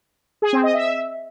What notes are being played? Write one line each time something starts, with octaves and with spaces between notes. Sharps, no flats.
G#4
C4
D#5
E5